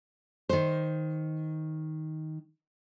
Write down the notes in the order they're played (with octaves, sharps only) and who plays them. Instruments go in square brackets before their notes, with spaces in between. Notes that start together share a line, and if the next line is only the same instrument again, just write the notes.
[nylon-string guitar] D#3 C5